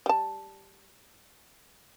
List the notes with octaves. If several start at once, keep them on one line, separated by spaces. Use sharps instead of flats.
G3 A5